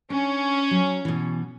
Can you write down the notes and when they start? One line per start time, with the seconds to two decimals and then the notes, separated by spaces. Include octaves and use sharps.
0.10 C#4 D4
0.71 F#3
1.05 B2 E3